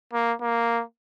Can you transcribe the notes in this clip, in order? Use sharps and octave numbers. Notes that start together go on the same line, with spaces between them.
A#3
A#3